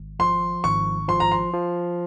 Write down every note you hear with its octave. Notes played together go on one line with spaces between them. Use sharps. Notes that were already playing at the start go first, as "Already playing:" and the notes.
Already playing: G#1
F3 C6
G#1 C#6
F3 C6
A#5
C6
F3